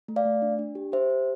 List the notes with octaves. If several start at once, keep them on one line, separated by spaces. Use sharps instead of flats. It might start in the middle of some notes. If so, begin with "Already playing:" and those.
A3
D5 F5
A3
D4
D4
G4
G4 C5 E5
G4